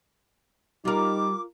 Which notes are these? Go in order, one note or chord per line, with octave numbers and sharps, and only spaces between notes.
G3 D#4 F4 A#4 D6